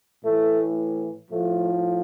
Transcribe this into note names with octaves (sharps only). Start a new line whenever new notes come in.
A2 E3 A3
A2 F3 A3